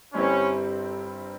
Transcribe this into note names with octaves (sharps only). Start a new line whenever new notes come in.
G1 G2 G3 C4 C#4 E4